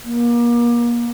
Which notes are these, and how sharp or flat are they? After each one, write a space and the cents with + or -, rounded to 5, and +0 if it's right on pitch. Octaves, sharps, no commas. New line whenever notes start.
A#3 +35